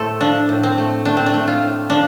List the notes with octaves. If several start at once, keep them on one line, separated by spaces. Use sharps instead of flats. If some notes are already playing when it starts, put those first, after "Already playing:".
Already playing: A2 A3 A4 C5
F3 D4
A2
C4
A3
A3 D4
C4
D4
A3
F4
A2
F3 D4